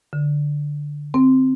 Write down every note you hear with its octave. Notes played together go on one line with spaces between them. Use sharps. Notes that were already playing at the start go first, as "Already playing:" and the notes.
D3
C4